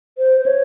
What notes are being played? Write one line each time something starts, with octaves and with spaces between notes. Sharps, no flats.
C5
C5
C#5